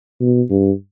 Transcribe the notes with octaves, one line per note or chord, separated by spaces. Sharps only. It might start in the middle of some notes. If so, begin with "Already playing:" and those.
B2
G2